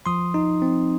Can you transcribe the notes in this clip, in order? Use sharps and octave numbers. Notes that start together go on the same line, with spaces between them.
F3 C6 D#6
D#4
C4